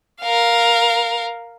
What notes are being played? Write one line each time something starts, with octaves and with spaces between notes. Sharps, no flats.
A#4 F5